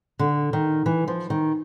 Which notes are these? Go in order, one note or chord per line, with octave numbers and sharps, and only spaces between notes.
D3
D#3
E3
F3
D#3